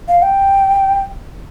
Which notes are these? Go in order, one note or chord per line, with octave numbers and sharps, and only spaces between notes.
F5
G5